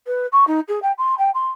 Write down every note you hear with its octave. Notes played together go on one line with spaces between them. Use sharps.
B4
C#6
D#4
G#4
G5
C6
G5
C6